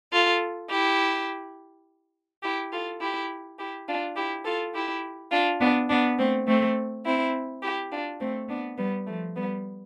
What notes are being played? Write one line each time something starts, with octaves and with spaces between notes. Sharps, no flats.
F4 A4
E4 G4
E4 G4
F4 A4
E4 G4
E4 G4
D4 F4
E4 G4
F4 A4
E4 G4
D4 F4
B3 D4
B3 D4
A3 C4
A3 C4
C4 E4
E4 G4
D4 F4
A3 C4
B3 D4
G3 B3
F3 A3
G3 B3